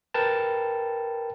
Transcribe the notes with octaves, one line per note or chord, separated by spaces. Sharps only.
A#4 B4 G5 A5